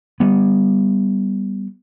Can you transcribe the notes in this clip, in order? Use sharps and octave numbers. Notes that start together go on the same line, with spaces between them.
G3 B3